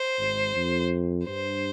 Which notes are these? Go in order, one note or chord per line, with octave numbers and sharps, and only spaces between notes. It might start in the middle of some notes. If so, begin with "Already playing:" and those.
Already playing: C5
G#1 G#2
F2
G2 C5